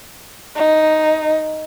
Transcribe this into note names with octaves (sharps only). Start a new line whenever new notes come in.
D#4